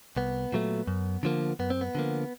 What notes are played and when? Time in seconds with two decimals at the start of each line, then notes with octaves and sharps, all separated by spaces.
0.17 C2 B3
0.52 A#2 F#3 A3
0.88 F#2
1.23 D3 F3 A#3
1.59 F#2 B3
1.70 C4
1.81 B3
1.95 D3 F3 A#3